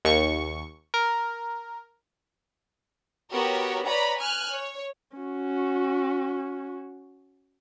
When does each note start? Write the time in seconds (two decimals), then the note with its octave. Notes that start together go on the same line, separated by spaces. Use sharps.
0.05 D#2 C#6
0.94 A#4
3.33 B3 F#4 G4 A#4 C#5
3.87 B4 C#5 D5 A#5 B5
4.19 G#5 F6 F#6
4.52 C#5
5.17 C#4 F#4